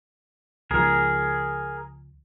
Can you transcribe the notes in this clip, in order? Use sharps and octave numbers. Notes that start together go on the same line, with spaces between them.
C#2 F3 G#4 A#4